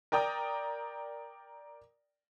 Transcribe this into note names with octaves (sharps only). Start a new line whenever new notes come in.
A#4 D5 G5 A#5 D#6